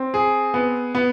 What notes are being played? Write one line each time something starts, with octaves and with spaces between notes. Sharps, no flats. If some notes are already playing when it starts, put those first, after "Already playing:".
Already playing: C4
G#4
B3
B3